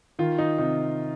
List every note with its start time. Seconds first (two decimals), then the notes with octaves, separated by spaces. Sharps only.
0.19 D#3 F4
0.38 D#4
0.58 C3 D#4